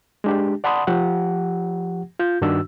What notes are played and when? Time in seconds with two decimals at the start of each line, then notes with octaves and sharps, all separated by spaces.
0.24 G#3 D4 G4
0.64 D5 F#5 A5 B5 C6 D#6
0.87 F3 G4 F#5
2.19 F4 G6
2.42 G2 D#3 D4 F#4 E6